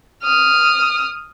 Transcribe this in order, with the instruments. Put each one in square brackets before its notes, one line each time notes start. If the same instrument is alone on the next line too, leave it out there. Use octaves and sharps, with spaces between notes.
[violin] D#6 F6